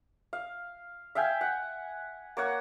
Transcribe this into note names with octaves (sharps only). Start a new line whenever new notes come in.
F5
E5 F5 G5 G#5
F#5
A#3 C#5 F#5